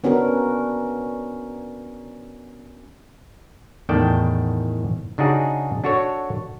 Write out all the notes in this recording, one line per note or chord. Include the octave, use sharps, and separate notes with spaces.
B3 C#4 D4 F#4 A#4
E2 A2 D#3 D5 G5 A5
C#3 D4 D#4 F#4 G#4
D4 F#4 A4 C#5